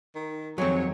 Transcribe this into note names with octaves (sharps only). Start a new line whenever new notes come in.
D#3
F2 D#3 F#3 G#3 C4 C#5